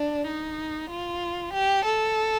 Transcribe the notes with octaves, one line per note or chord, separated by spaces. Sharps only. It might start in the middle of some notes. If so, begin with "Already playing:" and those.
Already playing: D4
D#4
F4
G4
A4